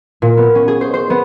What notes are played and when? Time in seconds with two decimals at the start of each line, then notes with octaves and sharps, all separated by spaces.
0.22 A#2
0.37 B3
0.55 C#4
0.68 G#4
0.81 C5
0.94 C5
1.10 B3